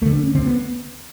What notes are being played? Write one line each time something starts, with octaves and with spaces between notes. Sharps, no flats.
D2 D3 A3
D4
C#4
D2 D3 C4
B3